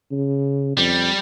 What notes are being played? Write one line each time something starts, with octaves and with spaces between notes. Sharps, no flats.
C#3
F2 G3